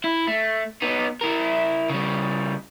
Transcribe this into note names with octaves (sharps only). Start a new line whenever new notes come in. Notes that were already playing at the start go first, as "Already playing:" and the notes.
E4
A3
B3 D#4
E4 A#4
C#3 G3